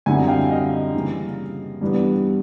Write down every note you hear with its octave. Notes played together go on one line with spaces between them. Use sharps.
F#2 D3 G3 C4 E4 F#5 G#5
F5 G5
D#5 F5
C#3 E3 G3 A#3
G2 E3 G3 B3